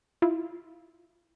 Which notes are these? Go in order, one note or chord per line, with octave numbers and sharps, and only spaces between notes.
E4 F4